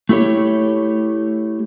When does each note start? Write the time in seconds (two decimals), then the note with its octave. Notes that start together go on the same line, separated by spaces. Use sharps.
0.09 A3 E4 G4 A4 C#5